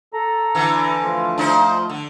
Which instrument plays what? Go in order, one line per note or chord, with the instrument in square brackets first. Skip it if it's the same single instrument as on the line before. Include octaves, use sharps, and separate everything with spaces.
[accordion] A4 A#5
[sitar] D3 E3
[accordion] F3 A3 F4
[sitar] D4 D#4 C5
D3